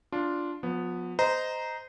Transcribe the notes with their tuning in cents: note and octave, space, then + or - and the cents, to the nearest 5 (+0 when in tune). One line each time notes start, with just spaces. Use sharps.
D4 -5 F4 +0
F3 +35 B3 +0
C5 -20 D#5 +0 A#5 +0